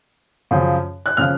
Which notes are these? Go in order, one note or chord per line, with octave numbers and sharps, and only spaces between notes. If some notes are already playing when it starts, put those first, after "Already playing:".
F#2 C#3 F3
F#6
C#3 F3 F6